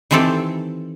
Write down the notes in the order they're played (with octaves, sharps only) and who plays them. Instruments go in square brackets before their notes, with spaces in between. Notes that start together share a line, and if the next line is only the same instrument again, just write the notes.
[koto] D#3 E3 C4 G4 A4